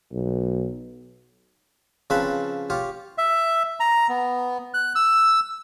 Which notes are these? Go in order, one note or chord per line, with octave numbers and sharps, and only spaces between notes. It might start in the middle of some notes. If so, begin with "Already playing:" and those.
B1
C#3 F3 C4 B4 A5 B5
F4 G4 C#5
E5
A#5
B3
F#6
E6